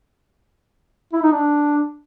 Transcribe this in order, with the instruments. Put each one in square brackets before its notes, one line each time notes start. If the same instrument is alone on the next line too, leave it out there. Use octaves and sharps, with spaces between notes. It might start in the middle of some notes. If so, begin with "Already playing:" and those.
[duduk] E4
D#4
D4